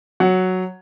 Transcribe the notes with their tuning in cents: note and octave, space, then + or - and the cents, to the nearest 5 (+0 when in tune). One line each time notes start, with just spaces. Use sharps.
F#3 +0 F#5 +0